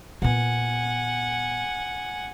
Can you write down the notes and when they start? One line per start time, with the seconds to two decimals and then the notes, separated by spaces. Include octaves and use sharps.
0.22 A#2 B3 F#5 G#5